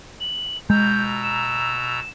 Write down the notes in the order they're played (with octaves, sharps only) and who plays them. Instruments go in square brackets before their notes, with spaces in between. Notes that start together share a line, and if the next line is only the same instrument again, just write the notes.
[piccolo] F#7
[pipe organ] B2 A#5 E6 [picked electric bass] G#3 [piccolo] G6
[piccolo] E7